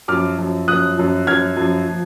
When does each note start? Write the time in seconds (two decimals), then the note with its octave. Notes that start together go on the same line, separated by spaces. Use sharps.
0.08 F#2 F3 D6 F6
0.39 F#2 F3
0.67 F#2 F3 D#6 F#6
0.97 F#2 F3
1.27 F#2 F3 F6 G#6
1.57 F#2 F3
1.89 F3